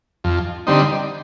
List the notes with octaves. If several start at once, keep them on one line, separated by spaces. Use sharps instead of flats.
F2
D3 G3 C4 D#4